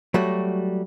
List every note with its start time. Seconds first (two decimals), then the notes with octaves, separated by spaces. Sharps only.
0.14 F#3 G3 A3 F#4